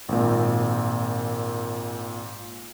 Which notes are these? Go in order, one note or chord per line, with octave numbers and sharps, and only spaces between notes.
G#1 A#2